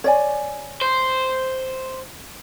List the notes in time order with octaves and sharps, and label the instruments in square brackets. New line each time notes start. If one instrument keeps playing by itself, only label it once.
[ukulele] C#5 D5 G#5
[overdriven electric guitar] C5